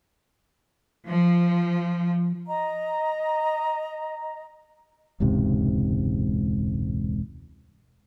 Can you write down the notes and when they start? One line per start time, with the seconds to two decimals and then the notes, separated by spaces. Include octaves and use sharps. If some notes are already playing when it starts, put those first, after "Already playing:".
1.07 F3
2.47 D#5 A#5
5.20 E1 C#2 G#2 C3